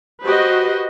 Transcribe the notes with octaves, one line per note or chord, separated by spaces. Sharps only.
F#4 G4 B4 C5 D#5